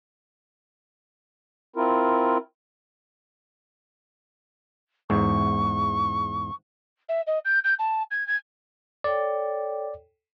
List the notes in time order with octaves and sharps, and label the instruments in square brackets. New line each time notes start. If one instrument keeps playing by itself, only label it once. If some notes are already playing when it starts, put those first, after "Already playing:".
[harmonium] C4 E4 F4 A#4
[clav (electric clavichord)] E2 G#2 [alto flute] C#6
[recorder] E5
D#5
G6
G6
A5
G#6
G#6
[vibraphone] A4 C#5 G5 [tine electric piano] D5